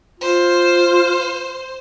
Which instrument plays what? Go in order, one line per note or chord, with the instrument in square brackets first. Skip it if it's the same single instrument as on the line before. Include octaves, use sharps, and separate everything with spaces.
[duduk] F4 [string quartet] C5